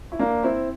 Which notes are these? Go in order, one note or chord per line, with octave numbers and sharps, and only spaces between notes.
E4
A#3 D4
C4 E4